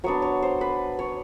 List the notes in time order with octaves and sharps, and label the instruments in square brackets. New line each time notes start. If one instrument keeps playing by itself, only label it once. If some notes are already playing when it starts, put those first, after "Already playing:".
[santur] F#3 B3 D4 C#5
C#5
C5
B4
C#5